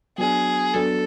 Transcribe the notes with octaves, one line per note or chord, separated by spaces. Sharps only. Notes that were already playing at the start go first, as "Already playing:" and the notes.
F#3 B3 D4 G#4
F#3 B3 D4 A4